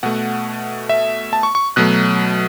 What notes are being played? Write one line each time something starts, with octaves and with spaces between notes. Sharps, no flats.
B2 A3 F#5
E5
A5
C#6
C#6
B2 F#3 A3 F#6